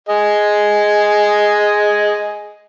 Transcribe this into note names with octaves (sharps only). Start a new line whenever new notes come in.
G#4 D#5